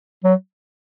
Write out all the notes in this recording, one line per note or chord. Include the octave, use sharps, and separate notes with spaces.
F#3